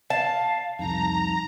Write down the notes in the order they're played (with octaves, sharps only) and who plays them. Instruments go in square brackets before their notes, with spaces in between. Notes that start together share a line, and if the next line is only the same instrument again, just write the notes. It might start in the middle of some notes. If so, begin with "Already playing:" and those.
[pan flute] F5 [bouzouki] A5
[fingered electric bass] C2 F2 [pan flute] D#4 [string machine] A#5